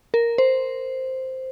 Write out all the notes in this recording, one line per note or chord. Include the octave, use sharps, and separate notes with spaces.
A#4
C5